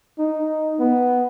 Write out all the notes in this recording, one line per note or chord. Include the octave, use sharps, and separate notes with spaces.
D#4
B3